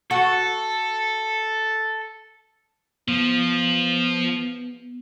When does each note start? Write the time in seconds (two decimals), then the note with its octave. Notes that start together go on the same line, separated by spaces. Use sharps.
0.11 F#4 A4
3.08 F3 B3